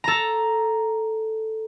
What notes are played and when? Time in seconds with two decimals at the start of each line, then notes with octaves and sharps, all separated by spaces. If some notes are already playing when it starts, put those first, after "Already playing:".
0.04 A4 A#5